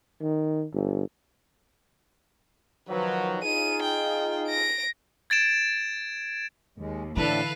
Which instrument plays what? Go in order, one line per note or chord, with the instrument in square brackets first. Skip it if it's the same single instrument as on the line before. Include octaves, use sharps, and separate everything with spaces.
[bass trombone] D#3
G1
[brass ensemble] D#3 F3 F#3 [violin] B4
[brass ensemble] D#4 F4 G#4 [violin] D#7
[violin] G5
A#6 D7
[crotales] G#6 A6 D7 E7
[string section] D#2 [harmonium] G#3
[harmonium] A2 D4 [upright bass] D3 E3 [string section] E4 A4 [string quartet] B4 F5